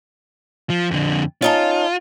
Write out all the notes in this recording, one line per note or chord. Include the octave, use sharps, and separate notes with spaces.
F3
F2 D3
C#4 D#4 F4 A5